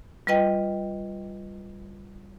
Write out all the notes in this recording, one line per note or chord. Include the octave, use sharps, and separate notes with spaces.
G3 F4 B4 D#5 G5